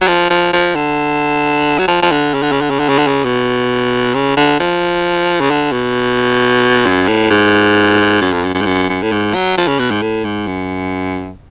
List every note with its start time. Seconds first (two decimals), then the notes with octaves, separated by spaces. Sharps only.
0.01 F#3
0.08 F3
0.30 F3
0.53 F3
0.75 D3
1.78 F#3
1.88 F3
2.02 F3
2.11 D3
2.34 C#3
2.42 D3
2.52 C#3
2.61 D3
2.70 C#3
2.79 D3
2.89 C#3
2.98 D3
3.07 C#3
3.24 B2
4.14 C#3
4.37 D3
4.60 F3
5.40 C#3
5.50 D3
5.72 B2
6.86 F#2
7.08 A2
7.30 G#2
8.21 F#2
8.33 F2
8.44 F#2
8.54 F#2
8.61 G#2
8.66 F#2
8.89 F#2
9.02 A2
9.11 G#2
9.34 F#3
9.57 F3
9.68 C#3
9.79 B2
9.91 G#2
10.02 A2
10.24 G#2
10.47 F#2